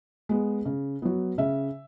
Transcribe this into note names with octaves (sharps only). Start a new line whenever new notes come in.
G#3 B3
C#3
F#3 B3
C#3 E5